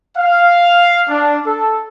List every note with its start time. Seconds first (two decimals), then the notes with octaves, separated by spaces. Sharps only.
0.18 F5
1.09 D4
1.46 A4